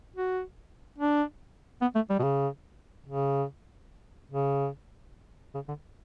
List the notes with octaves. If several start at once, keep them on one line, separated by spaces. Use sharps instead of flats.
F#4
D4
B3
A3
G3
B2
C#3
C#3
C#3
C#3
D3